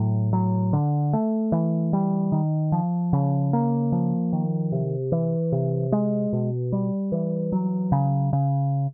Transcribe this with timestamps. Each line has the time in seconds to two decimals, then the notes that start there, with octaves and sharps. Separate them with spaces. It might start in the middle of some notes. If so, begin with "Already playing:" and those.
Already playing: A2 F#3
0.33 F#3
0.73 D3
1.13 A3
1.52 E3
1.93 G3
2.32 D#3
2.72 F3
3.13 C#3
3.53 A#3
3.92 F3
4.33 D#3
4.72 C3
5.12 E3
5.52 C3
5.92 G#3
6.33 B2
6.72 G3
7.12 E3
7.52 F#3
7.92 C#3
8.33 C#3